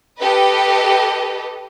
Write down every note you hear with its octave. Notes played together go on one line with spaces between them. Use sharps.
G4 A4 B4 D#5